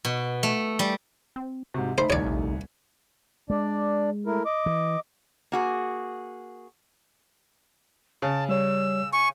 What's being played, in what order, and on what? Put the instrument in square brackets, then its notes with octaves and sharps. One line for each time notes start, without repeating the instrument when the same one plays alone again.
[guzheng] B2
A3
G3
[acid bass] C4
[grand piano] G#2 C3 [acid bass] F#4
[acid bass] C#3 [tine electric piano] A3 D#4 A4 [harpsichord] C5 [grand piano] B5
[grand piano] D#1 C2 G#6 [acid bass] D#3 [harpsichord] C#5 D5
[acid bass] A#1
[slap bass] G#3 [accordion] D4 D5
[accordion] A3 E4 A#4
D#5 D6
[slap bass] E3
[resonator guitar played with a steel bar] A#3 F#4 G#4
[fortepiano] C#3 [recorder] A5
[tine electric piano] G3 C#5 [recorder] E6
[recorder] G#5 [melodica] C#6